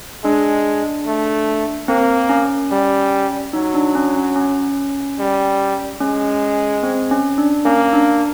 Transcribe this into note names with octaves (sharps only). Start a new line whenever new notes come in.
G#3 D4
A3
A#3 C4
C#4
G3
F#3 D#4
D4
C#4
C#4
C#4
G3
G#3 C#4
C4
C#4
D4
A#3 C#4
D4